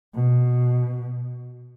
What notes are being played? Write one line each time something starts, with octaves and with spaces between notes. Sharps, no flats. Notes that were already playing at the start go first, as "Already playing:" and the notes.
B2